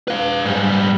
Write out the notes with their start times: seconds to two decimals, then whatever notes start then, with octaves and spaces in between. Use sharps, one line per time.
0.08 B4 F5
0.45 G#2 G3